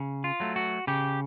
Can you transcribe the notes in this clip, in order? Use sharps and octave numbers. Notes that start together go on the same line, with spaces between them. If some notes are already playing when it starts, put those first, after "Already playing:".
Already playing: C#3
F4
F#3 A3
F#4
C#3 G4